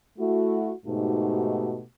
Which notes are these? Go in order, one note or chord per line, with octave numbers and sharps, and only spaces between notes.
A3 E4 F#4
G#2 B2 A3 D#4 F#4 G4